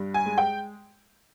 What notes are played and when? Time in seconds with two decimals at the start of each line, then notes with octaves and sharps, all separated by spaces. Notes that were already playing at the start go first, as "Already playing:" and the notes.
Already playing: G2
0.14 G#5
0.25 G#3
0.38 G5